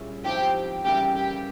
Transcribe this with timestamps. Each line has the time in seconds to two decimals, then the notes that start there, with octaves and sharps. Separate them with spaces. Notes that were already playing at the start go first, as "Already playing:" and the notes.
Already playing: A#2 G3 C#4 E4 G#4
0.25 G#2 F3 C4 E4 G4
0.84 C#3 E3 G3 A#3 E4 G4
1.15 G4